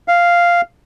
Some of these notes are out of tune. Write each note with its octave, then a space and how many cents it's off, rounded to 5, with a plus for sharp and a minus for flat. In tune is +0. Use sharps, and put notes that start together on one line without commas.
F5 -5